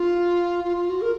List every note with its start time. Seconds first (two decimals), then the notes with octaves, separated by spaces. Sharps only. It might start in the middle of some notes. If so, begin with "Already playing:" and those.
Already playing: F4
0.64 F4
0.77 F4
0.89 F#4
1.02 A#4